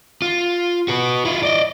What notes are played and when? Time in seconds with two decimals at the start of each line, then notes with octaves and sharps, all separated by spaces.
0.22 F4
0.88 F#4 B4
1.25 E4 F4
1.43 D5 D#5